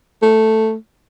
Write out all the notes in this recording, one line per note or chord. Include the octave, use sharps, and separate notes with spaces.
A3